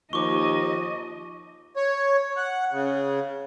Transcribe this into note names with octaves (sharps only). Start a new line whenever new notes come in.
D#2 F3 D#5 C#6 D6
C#5
F#5
C#3